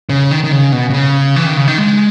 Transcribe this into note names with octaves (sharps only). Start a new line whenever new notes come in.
C#3
D#3
D#3
C#3
B2
B2
C#3
E3
D#3
C#3
D#3
G#3